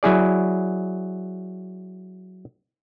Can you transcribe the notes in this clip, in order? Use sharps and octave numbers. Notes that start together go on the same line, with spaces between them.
F#3 E4 G#4 D5